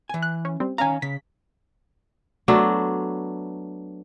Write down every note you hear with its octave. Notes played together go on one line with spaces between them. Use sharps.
E3 G#5
F#6
C#4
G3 C4
D#3 C#4 F5 G#5 A#5
C#3 B6
F#3 A3 B3 D4